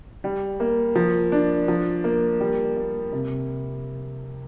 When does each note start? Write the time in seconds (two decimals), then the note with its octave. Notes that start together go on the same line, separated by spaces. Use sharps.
0.24 G3
0.60 A#3
0.95 F3
1.32 D4
1.68 F3
2.04 A#3
2.40 G3
2.77 A#3
3.12 C3